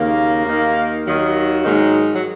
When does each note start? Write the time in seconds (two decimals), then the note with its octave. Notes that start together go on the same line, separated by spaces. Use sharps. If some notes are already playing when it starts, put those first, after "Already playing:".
Already playing: D#2 C#3 A#3
0.46 D#2 D#3
1.05 D#2 D#3 F#3
1.64 G#2 D#3
2.13 F#3